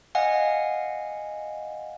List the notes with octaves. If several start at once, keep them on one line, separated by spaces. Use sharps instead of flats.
D#5 F5 F#5 G#5